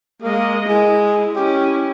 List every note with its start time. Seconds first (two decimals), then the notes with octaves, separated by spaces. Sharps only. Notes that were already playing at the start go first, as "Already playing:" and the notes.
0.22 G#3 A#3 D#5
0.68 G#3 E4
1.36 C#4 E4 G4